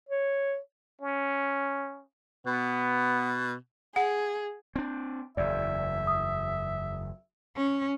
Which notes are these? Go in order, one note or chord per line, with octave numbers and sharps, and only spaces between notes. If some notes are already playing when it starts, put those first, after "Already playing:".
C#5
C#4
B2 B3
G#4 F#5
C4 D4
F#1 E2 D5 E5
D#6
C#4